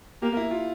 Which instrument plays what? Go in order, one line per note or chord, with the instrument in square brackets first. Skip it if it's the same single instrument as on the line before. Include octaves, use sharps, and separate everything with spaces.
[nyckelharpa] A#3 [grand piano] G4
[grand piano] E4
F4